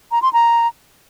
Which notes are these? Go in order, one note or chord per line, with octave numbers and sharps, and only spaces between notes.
A#5
C6
A#5